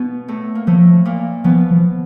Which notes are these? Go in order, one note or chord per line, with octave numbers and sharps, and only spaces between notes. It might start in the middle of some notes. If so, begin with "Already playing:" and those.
Already playing: B2 B3
A2 A3
A#3
A2 F3 A3
A#2 A#3
B2 F3 B3
F3